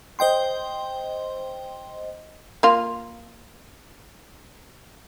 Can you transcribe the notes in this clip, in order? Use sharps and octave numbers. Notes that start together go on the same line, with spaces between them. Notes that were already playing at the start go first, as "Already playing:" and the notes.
C5 D#5 G5 C6
A#3 F4